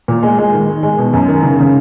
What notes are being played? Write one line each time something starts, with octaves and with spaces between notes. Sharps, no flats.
A#2
G#3
G#3
D#3
D#3
G#3
B2
F#2
D#3
C#3
C#3